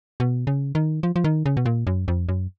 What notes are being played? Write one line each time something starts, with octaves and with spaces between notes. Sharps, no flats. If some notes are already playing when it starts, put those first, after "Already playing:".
B2
C#3
D#3
F3
F3
D#3
C#3
B2
A#2
F#2
F2
F#2